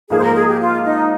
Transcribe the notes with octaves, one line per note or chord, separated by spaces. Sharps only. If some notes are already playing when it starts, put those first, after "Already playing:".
G#2 F3 A#3 G#4
C5
A#4
G#4
G4
F4
D#4